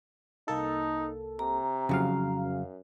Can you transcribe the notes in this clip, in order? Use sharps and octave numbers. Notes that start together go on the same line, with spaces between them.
C2 A#3 D#4 A4
C3 A#5
F2 C#3 F#3 F5
F#2